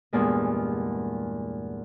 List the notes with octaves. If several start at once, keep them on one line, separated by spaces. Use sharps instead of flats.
E2 G2 A#2 G#3